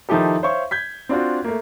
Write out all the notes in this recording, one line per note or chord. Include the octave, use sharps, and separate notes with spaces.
D#3 F3 D#4 E4 G4 A4
C5 C#5 E5 F5 C#6
G6 G#6 B6
C4 D4 F4 F#4
A3 A#3